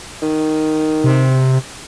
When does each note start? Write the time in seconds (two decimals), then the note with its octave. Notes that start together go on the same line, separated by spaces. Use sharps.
0.22 D#3
1.04 C3